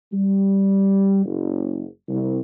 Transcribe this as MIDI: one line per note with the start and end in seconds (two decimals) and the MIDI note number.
0.12 1.22 55
1.25 1.86 30
2.08 2.39 36